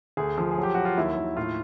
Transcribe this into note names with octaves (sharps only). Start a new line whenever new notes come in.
D2 G#4
F3
G#4
F#3
G4
F#3 F#4
F4
D#2 E4
D#2
A2 F4